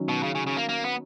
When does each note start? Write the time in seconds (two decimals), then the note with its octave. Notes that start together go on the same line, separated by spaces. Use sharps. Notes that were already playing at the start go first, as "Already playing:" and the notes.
Already playing: D#3 F#3 C#4
0.09 B2
0.23 C#3
0.35 C#3
0.47 C#3
0.57 A#3
0.69 A#3
0.84 B3